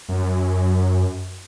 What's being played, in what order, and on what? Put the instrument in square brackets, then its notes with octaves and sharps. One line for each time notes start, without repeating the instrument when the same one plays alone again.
[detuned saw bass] F#2